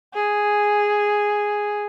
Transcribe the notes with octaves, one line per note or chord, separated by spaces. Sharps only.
G#4